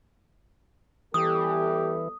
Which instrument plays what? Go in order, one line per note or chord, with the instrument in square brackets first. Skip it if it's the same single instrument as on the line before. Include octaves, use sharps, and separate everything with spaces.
[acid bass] E3 [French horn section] G3 B3 A4 [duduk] G4 [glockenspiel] D#6